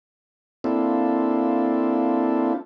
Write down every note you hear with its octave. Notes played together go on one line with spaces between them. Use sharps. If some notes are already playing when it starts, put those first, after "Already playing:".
A#3 C4 D4 E4 F4 A4